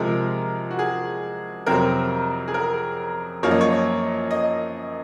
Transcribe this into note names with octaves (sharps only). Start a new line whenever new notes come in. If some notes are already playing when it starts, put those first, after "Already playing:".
Already playing: C3 F3 G#3 A#4
F#4
G#4
F2 C3 F#3 C4 A#4
G#4
A#4
F#2 F3 A#3 C#5
D#5
C#5
D#5